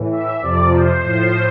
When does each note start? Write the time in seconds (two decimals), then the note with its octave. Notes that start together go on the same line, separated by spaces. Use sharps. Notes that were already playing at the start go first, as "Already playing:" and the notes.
Already playing: A2 E3
0.11 E5
0.41 F2 C3 F3 D5
0.72 C5
1.02 A2 F3